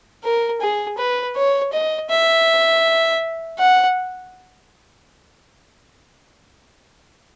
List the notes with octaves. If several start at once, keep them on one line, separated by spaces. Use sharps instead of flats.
A#4
G#4
B4
C#5
D#5
E5
F#5